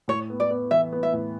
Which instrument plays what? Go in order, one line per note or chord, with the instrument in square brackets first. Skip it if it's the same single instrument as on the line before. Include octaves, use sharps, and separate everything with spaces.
[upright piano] A2 [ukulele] C#5
[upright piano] B3
[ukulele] D5
[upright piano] B3
[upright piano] E3 [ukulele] E5
[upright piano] B3
[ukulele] E5
[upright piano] A2